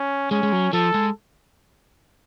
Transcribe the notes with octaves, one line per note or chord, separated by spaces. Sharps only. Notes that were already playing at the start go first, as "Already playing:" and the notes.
Already playing: C#4
G#3 C#4
G#3
F#3
F3 A4
G#3